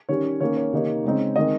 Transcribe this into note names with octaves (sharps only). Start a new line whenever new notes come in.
D#3 G3 C#4 C#5
D#3 A#3 C#4 C#5
C#5
C3 D#3 A#3 D#4
C#3 G#3 C4 D#4
D#3 G#3 C4 D#4 D#5